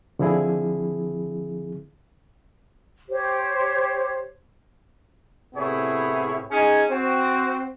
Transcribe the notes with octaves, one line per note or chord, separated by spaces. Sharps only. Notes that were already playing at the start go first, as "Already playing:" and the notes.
D3 F3 C4 E4 G#4
G4 C5 C#5
A2 C3 B3 E4 G#4 C#5
C#4 D#4 G#4 G#5
C4 F#4